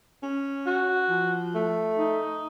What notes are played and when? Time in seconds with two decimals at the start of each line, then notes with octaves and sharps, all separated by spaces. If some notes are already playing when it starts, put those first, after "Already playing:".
0.22 C#4
0.66 F#4
1.10 F3
1.53 A3
1.96 D#4